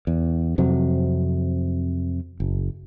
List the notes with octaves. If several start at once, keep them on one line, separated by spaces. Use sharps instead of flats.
E2
F2 C3 F#3
F#1